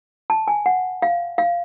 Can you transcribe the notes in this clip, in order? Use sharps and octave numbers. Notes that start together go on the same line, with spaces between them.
A5
G#5
F#5
F5
F5